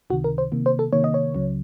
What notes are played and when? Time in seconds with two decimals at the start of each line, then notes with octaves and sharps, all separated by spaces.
0.10 C#2 C3 D#3 F#4
0.24 A#4
0.38 C5
0.52 C3 D#3 A#3
0.66 C5
0.79 A4
0.93 C3 D#3 A#3 C#5
1.04 D#5
1.14 C#5
1.34 C#2 C#3 F#3